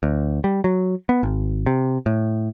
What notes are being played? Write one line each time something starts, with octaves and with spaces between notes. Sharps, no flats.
D2
G3
F#3
B3
G#1
C3
A2